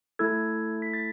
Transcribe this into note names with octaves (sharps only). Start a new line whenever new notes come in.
A3 E4 A4 E6 G#6
B6
A6